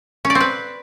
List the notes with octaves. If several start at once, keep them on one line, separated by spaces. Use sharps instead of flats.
C#4
D5
C4
B4